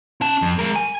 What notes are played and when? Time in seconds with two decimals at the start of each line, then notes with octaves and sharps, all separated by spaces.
0.21 C#4 A5
0.42 F2
0.59 G#3 A#4
0.76 G#5